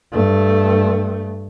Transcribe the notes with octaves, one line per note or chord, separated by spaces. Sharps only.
G2 A3